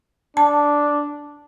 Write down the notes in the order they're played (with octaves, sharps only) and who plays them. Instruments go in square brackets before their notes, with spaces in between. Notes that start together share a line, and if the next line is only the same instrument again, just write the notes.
[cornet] D4 [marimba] A5